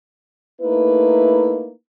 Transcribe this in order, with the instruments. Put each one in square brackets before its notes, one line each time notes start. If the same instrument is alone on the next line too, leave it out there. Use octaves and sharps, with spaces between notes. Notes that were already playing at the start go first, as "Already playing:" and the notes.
[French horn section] A3 A#3 D#4 E4 B4